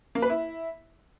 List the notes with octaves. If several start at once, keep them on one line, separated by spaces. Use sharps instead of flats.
A#3
B4
E4